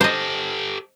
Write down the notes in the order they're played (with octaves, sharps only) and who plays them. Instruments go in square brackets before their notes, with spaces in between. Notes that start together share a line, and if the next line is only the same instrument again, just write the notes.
[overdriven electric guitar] G4 A4 [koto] C5 D#5